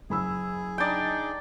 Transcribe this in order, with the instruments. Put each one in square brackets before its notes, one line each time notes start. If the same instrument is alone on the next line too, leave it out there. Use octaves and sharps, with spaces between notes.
[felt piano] F#1 B5 E6 [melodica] G#4
[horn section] D4 D#4 [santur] D5 G5